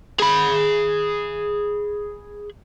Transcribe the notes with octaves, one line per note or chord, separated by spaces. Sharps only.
G#4 B5